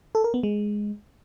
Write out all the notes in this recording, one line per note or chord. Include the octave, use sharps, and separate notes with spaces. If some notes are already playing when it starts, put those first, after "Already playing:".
A4
A#4
B3
G#3